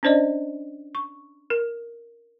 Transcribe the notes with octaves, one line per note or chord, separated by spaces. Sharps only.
C#4 D4 C5 D5 D#5
C#6
A#4